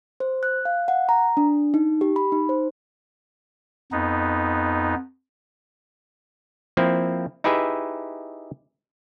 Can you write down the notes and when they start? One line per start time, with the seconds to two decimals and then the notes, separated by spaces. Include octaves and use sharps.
0.20 C5
0.43 F#6
0.65 F5
0.88 F#5
1.09 A#5
1.37 D4
1.74 D#4
2.01 G4
2.16 B5
2.32 D#4
2.49 C5
3.92 F2 B3 D#4
6.77 F3 A#3 C4 E4
7.44 D#4 E4 G4 G#4 B4 E5